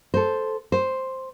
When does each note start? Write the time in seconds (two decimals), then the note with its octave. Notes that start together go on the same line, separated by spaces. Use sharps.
0.14 A4 C5
0.72 C5